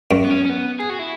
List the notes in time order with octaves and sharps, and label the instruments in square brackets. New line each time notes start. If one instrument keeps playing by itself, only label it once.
[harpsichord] F#2
[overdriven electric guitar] B3
C#4
C#4
B3
G#4
F#4
E4